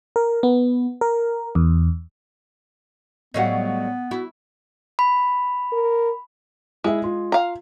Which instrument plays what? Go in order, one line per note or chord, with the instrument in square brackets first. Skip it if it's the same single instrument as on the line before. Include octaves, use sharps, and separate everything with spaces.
[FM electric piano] A#4
B3
A#4
E2
[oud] A2 F#3 G3 [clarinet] B3 [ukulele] D#5 F5 F#5
[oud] E4 [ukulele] F#4
[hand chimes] B5
[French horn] A#4
[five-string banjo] G#3 [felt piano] E4 G#4 E5
[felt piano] F4
[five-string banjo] F5 A#5